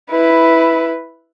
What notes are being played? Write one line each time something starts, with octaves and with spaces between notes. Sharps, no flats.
E4 B4